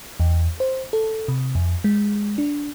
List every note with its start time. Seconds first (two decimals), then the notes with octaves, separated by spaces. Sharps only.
0.20 E2
0.60 C5
0.93 A4
1.28 C3
1.55 F2
1.84 G#3
2.38 D4